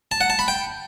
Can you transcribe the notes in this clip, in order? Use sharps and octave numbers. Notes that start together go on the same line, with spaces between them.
A5
F#5
A5
B5
G5